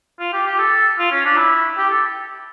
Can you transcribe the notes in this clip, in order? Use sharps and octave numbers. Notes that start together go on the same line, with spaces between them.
F4
G4
G4
A4
F4
C#4
D4
E4
G4
A4